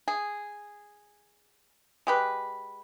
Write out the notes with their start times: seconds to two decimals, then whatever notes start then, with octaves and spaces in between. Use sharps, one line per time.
0.08 G#4
2.07 G#3 G4 B4